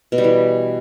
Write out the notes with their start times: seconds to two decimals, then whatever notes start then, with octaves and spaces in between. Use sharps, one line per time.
0.12 B2
0.18 G3
0.24 E3